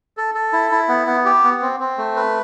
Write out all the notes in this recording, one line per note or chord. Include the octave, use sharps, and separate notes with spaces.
A4
A4
E4
E4
B3
B3
G4
B3
C4
C4
A3
B4